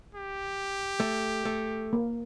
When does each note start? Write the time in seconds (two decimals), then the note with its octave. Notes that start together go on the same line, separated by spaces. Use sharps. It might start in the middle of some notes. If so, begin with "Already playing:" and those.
0.15 G4
1.00 A3
1.45 A3
1.93 A#3